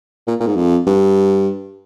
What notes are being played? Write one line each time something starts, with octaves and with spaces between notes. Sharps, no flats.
A#2
A#2
G#2
F2
G2